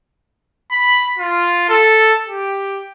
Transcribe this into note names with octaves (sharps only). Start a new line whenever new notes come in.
B5
F4
A4
G4